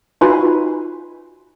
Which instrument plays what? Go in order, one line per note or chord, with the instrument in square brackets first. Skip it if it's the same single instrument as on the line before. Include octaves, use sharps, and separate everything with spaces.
[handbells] D#4 F4 F#4 B4 G#5 B5